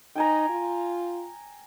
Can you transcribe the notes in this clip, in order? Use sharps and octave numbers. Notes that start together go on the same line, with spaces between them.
D#4 G5 G#5 A#5
F4